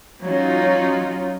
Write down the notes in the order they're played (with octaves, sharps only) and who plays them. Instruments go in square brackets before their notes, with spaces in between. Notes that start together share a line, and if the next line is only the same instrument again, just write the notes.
[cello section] F#3 C#4 D#4 F4